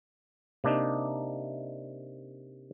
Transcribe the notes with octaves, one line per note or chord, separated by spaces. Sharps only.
C3 A#3 D4 D#4